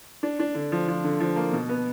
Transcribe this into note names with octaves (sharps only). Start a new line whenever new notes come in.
D4
D4
D3
F3
F3
D3
F3
A#3
B2
B3